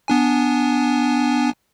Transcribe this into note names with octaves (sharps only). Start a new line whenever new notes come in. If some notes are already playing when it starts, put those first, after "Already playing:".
B3 D4 G#5